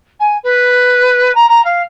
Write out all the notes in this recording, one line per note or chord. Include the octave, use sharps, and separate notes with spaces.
G#5
B4
A#5
A#5
F5